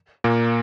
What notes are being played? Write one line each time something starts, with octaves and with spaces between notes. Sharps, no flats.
A#2 A#3